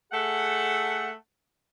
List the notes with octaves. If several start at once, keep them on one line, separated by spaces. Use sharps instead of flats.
A3 G#4 A4 F#5